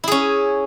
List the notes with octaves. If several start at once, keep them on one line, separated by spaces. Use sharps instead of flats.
C#4 E4 G#4